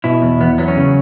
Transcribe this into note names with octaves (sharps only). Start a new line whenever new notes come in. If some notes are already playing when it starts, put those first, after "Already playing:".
B2 E4
E2
E2 B3
F#3 B3
C#4
C#3